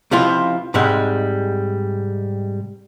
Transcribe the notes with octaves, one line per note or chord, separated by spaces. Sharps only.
C#2 C3 F3 E4 F4
G#2 C3 G3 G#3